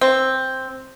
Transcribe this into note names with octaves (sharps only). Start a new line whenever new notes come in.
C4